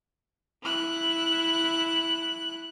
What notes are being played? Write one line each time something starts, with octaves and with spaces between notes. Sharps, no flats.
E4 F#6